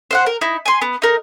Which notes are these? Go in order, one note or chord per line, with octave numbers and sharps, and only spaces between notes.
C5 F5 F#5
A#4
D#4 E4
G#5 C6
B3
D#4 A#4